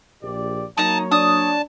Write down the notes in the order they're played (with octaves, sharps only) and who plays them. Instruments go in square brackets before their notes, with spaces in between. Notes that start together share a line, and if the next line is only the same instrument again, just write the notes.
[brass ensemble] A#1 G4 D5
[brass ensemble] F#3 A#3 C#5 [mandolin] D#4 A#5 [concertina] A5
[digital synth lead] D4 [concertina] A5 [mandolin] D#6